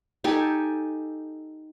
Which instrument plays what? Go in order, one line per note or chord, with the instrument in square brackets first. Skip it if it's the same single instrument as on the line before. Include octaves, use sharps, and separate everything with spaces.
[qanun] D#4 G4 A4 G#5